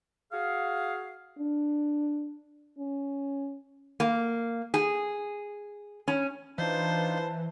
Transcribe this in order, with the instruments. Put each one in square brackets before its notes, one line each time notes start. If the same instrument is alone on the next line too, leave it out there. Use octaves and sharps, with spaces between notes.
[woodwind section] F#4 G#4 F5
[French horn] D4
C#4
[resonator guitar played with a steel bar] A#3
G#4
C#4
[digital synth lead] E3 [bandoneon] D4 D#4 F4 [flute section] B4 A5 [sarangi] C5